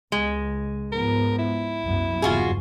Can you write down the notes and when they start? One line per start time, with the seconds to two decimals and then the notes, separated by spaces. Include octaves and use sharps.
0.12 C#2 G#3
0.92 G#2 F3 B3 A#4
1.38 E4
1.81 C2 F#2 B3
2.22 F#1 E2 G2 F4 F#4 G#4